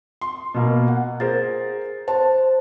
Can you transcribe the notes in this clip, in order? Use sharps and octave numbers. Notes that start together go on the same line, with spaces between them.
C6
B2 A#3
F#5
G#4 A#4 C5 A6
C5 A5